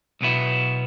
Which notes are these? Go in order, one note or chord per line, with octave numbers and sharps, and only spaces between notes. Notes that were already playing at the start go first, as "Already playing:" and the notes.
B1 B2 B3 E4